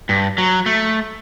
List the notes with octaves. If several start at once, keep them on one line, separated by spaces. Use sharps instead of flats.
G2
F#3
A3